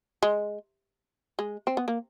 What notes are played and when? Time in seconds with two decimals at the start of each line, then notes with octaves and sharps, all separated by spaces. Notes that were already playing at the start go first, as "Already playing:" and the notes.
0.23 G#3
1.39 G#3
1.67 C4
1.77 B3
1.88 A#3